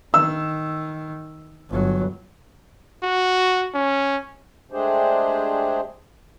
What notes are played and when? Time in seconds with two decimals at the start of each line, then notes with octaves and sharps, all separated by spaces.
0.14 D#3 E6
1.70 G1 F#3
3.03 F#4
3.74 C#4
4.72 G#3 A3 D4 G4 G#4 C5